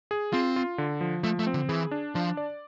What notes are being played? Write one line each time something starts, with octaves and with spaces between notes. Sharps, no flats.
G#4
C4 F4
F4
D3
F3
F3 A3
A3
C4
D3
E3 G#4
D4
F3 D4
D5